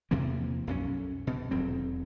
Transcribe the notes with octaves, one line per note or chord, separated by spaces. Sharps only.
E2 C3 F3 A#3
B1 F#2 C#4
B2
D#1 E2 F#3 C4